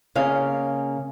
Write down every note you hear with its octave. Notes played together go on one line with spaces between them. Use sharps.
C#3 A#3 D#5 F5